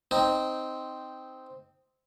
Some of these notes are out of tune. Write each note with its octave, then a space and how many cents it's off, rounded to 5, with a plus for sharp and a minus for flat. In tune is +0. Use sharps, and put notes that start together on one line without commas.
C4 -5 D#4 +0